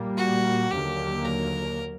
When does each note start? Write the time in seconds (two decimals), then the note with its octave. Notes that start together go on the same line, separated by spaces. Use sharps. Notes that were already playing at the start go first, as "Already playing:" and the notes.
Already playing: A#2 G3 A#3
0.17 F#4
0.70 D#2 D3 F#3 A#3 G4
1.25 A#4